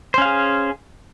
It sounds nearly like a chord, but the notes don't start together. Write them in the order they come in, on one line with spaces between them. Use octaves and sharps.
C5 C#4 F5 G#4